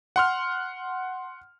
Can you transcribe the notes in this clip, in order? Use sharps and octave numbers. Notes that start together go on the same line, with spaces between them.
F#5 C6 F6